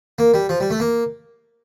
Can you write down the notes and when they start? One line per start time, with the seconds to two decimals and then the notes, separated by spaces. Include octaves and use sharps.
0.19 A#3
0.34 G3
0.49 F3
0.60 G3
0.70 A3
0.80 A#3